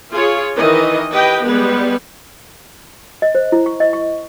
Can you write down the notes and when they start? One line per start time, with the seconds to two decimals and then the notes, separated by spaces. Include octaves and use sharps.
0.11 F4 G#4 C#5
0.55 D#3 E3 D#5
1.12 G4 B4 D#5 G5
1.45 G3 G#3 B3 B4
3.22 D#5
3.35 C5
3.52 E4
3.66 C#6
3.80 D#5
3.93 C#6